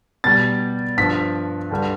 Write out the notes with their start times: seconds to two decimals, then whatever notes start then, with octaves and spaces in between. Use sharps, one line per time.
0.24 B2 G3 A6
0.97 G2 F3 B6
1.71 G2 D3 G3